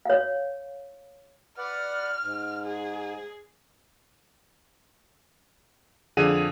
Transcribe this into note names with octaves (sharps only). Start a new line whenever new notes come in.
C#5 F5
B4 D5 F#5 F6
G#2
G#4
F2 D3 G#4 D#7